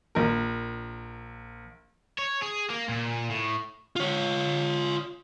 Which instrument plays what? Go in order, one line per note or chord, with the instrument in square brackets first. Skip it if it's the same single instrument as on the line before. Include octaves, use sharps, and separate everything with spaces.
[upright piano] A#1 A#4
[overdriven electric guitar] C#5
G#4
A#3
A#2
A2
[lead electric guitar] F4 C#5